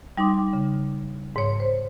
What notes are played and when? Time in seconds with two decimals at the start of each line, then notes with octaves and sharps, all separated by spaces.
0.18 G3 D#4 C6 D6
0.53 C#3
1.36 G#2 C#5
1.60 C5